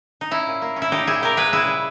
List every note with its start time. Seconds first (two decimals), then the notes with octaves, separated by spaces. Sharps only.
0.21 D#4
0.31 C#4 E4
0.47 A#2
0.62 A#3
0.76 C#4
0.82 E4
0.91 A#2 D#4 G4
1.07 A#2 E4 G#4
1.20 A#2 G4 A#4
1.37 G#3 G#4 B4
1.52 C#3 E4 G#4
1.67 G3